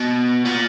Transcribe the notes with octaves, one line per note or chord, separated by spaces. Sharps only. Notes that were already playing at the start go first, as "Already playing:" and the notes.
Already playing: B2
A#2